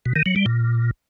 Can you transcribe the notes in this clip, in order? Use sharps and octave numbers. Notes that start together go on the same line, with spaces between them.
B2
D#3
F#3
G3
A#2